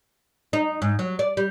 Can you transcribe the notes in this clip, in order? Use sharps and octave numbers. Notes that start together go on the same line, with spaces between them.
D#4
G#2
F#3
D5
G3